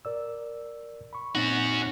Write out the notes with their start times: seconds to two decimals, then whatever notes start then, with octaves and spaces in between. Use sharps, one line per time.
0.05 A#4 D5 E6
1.13 B5 C#6
1.35 A#2 C4 C#4 D#4 F#4